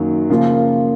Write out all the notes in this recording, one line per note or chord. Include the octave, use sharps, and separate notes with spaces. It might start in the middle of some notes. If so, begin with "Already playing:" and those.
Already playing: F#2 D#3 F#3 A#3
C#3 F3 A#3 F4